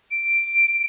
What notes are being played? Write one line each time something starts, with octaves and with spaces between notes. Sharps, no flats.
D7